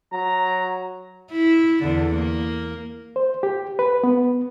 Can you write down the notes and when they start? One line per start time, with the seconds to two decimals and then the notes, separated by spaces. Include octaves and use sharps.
0.13 F#3 A#5
1.31 E4
1.83 E2 D3
2.14 A#3
3.16 C5
3.43 G4
3.79 B4
4.04 B3